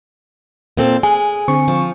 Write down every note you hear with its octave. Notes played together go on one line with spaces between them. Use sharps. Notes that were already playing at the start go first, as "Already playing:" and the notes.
A#2 C4 A4
G#4 G#5
D3 C4 C#6
F3